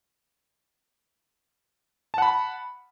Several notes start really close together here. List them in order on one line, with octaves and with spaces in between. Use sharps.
A5 F#5 B5